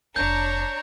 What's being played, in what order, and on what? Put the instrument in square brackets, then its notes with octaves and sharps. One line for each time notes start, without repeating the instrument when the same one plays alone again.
[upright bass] F1 C4 [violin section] D4 C#5 A#5 [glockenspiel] G6